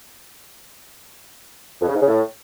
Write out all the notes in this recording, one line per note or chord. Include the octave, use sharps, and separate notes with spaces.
F2
C#3
G#2
C#3
A2